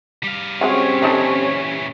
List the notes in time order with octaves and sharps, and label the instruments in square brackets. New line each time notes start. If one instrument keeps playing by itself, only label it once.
[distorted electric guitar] G3 F5
[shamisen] G#3 F#4 F#5 [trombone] C4 [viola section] C#4 G4 C#5
[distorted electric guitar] A#2 E3 [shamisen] D4 D#4 A4